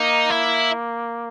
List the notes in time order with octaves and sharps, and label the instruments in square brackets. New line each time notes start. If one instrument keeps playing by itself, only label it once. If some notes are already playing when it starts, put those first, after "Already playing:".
Already playing: [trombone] A#3 [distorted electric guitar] D#4
[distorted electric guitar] E4